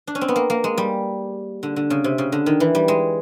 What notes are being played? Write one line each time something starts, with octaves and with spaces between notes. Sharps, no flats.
D4
C#4
C4
B3
A#3
A#3
G#3
G3
D3
D3
C#3
C3
C#3
D3
D#3
E3
G3
G#3